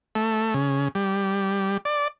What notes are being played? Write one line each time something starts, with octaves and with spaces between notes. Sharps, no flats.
A3
C#3
G3
D5